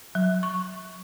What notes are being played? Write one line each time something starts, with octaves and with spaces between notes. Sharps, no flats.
F#3
C#6